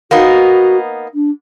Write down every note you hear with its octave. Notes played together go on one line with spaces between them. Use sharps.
A#3 B3 D#4 F#4
D4